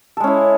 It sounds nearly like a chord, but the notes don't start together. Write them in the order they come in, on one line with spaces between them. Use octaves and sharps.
A4 G#3 C#4 E4